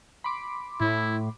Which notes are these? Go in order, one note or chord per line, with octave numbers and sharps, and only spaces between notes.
B5 C6 D6
A2 E4